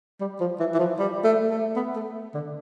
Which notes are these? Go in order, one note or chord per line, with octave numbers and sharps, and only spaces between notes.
G3
F3
E3
E3
F3
G3
A3
A3
B3
A3
D3